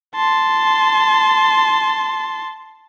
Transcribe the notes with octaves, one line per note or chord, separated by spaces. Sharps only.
A5 C6